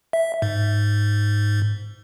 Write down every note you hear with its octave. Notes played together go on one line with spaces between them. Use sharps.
E5
G#2